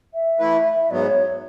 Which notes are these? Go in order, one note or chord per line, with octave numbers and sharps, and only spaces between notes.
E5
E3 A3 E4 B4
G#2 F#3 B3 D5
B4
C#5